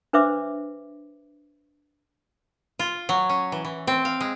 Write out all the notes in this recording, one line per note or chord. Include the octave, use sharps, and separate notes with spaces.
D4 B4 C5 E5 D6
F4
F#3
C#4
E3
E3
C4
F5
G#3